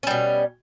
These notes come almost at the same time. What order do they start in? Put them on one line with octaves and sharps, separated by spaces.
C#4 G3 B2